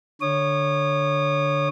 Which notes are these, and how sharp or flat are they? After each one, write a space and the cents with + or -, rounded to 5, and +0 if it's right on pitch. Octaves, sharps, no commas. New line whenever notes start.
D3 +5 C#5 +0 D#6 -35